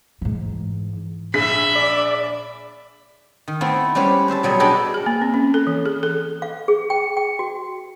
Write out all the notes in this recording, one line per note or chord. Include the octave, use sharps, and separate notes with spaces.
G#2 E3
A#1 G#4 E5 B5 B6
D5
D#3
A3 B3 C4 E4
G3 G#3 C#4 G4 B4 C5
B4 C5 E5 A5
B2 F#3 G3 B3 G#4
G#3 D4 A4 B4 D#5 G5
G#4
A#3
C4
C#4
A4
E3
G#4
A4
F5
G#4
G5
G5
F#4